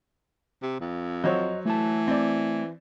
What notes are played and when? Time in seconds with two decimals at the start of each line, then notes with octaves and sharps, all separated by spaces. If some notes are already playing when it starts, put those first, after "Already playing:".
0.62 C3
0.80 F2
1.24 F#3 C5 C#5 D#5
1.65 E3 A3 A5
2.07 C4 D5